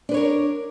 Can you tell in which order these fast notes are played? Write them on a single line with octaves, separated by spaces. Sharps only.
D4 B4 C#5 A#4